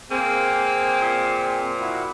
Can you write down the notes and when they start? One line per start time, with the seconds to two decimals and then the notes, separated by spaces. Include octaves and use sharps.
0.11 A#3 C4 G#4
1.01 A#2
1.80 E4 F#4